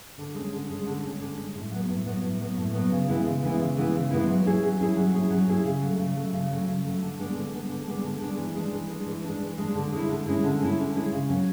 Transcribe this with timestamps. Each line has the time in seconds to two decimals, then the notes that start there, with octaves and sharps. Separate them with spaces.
0.18 D3
0.34 G#3 C#4
0.52 D3
0.68 G#3 C#4
0.86 D3
1.03 G#3 C#4
1.20 D3
1.37 G#3 C#4
1.55 A2
1.71 F#3 B3
1.89 A2
2.06 F#3 B3
2.22 A2
2.40 F#3 B3
2.57 A2
2.74 F#3 B3
2.91 C#3
3.08 E3 G#3 B3 E4
3.25 C#3
3.42 E3 G#3 B3 E4
3.60 C#3
3.77 E3 G#3 B3 E4
3.94 C#3
4.11 E3 G#3 B3 E4
4.27 F#3
4.45 C#4 E4 G#4
4.62 F#3
4.80 C#4 E4 G#4
4.96 F#3
5.13 C#4 E4 G#4
5.30 F#3
5.47 C#4 E4 G#4
5.65 C#3
5.81 F#3 A3
5.99 C#3
6.16 F#3 A3
6.33 C#3
6.50 F#3 A3
6.67 C#3
6.84 F#3 A3
7.02 D3
7.19 G#3 B3 D4
7.35 D3
7.53 G#3 B3 D4
7.69 D3
7.87 G#3 B3 D4
8.04 D3
8.21 G#3 B3 D4
8.38 E3
8.55 G#3 D4
8.72 E3
8.90 G#3 D4
9.06 E3
9.24 G#3 D4
9.41 E3
9.58 G#3 D4
9.75 D3
9.92 G#3 C#4 E4
10.09 D3
10.26 G#3 C#4 E4
10.43 D3
10.60 G#3 C#4 E4
10.78 D3
10.95 G#3 C#4 E4
11.12 C#3
11.29 F#3 C#4